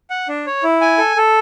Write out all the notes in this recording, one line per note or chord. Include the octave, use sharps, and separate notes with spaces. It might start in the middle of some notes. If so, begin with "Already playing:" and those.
F#5
D4
C#5
E4
G#5
A4
A4